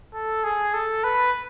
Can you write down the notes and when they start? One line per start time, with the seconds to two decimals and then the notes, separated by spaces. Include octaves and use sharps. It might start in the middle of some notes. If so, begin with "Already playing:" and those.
0.13 A4
0.44 G#4
0.74 A4
1.04 B4